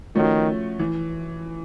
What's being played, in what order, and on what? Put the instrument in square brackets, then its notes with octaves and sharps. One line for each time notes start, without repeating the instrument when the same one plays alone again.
[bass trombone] D#3 [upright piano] F3 A3 C#4 F#4
[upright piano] E3